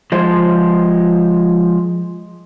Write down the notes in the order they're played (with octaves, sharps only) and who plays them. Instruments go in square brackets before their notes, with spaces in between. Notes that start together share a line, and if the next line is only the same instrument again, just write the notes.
[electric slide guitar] F3 G#3 C5